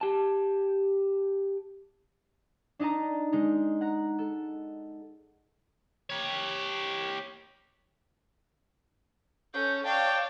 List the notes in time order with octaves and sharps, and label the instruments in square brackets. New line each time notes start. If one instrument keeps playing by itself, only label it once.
[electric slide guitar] G4 A5
[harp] D4 D#4 D#5 A5 A#5
G#3 D#4
F#5 A#5
A4
[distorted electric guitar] G4 C#5
[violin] C#4 A4 [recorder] G6
[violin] C#5 F5 [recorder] D5 [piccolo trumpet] G5 [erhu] A5